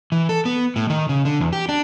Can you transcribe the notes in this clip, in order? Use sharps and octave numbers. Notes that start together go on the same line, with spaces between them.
E3
A4
B3
A2
D#3
C#3
D3
E2
G4
D4